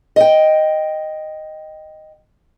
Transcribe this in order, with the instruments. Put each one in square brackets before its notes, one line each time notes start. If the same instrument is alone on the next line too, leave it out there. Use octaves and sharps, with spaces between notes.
[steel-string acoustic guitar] D#5 G5